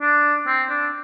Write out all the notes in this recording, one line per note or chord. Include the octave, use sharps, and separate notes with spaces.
D4
C4
D4